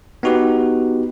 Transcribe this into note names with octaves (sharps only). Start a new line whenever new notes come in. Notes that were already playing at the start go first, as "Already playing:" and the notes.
B3 D#4 F#4 G4 B4